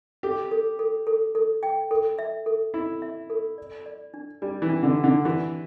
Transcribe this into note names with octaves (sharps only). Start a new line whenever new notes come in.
G4 A4
A4
A4
A4
A4
G5
A4
E5
A4
E4 E5
E5
A4
D5
D5
D4
G3 D4
E3
D4
D3
D4
D3
E3 G4